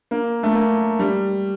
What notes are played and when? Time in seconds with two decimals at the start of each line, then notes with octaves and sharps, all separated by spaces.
0.11 A#3
0.43 A3
0.55 A#3
0.99 G3